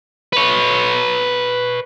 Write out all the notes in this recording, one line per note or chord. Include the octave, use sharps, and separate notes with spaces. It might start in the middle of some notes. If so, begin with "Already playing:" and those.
B4 C#5